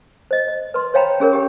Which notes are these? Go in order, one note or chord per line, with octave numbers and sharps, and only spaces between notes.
C5 D#5
D#5
B4 C6
C5 C#5 F5 G5 A#5 B5
C#4 G#4 A#4 C#5
G4 A#4 G5